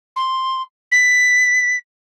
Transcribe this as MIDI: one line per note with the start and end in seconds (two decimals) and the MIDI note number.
0.16 0.62 84
0.92 1.76 95